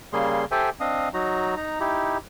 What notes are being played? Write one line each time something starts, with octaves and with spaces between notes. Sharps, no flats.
C#3 G3 A#3 G#4 C6
G4 A4 C5 E5 G5 G#5
C4 D4 D#5 F5 D#6
F#3 D#4 F#4 A#5
D#4 A#5
D#4 E4 G4